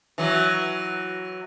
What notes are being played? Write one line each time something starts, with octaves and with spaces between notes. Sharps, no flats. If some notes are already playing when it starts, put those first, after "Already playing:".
E3 F#3